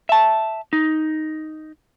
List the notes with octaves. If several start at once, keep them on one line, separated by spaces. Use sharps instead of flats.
E5 A5
D#4